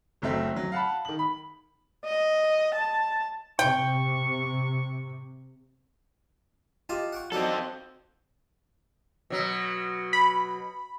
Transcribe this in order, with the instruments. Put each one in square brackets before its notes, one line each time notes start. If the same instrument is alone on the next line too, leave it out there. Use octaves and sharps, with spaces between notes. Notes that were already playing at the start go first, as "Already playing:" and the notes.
[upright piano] F#1 D2 F#3 A3 C4 E5
F#3
F5 F#5 A5 B5
D#3 F#7
B5
[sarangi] D#5
A5
[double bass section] C3 [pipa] G5 [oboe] C#6
[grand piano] F4 [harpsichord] G4 D#5 A5
[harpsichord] F#5 G5 C#6
[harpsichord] F#3 D4 D#4 [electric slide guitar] C4 A4
[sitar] B2 F#3
[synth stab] B5